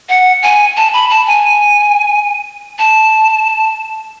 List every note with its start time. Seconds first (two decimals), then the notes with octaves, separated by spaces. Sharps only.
0.09 F#5
0.43 G#5
0.76 A5
0.93 B5
1.10 A5
1.27 G#5
2.79 A5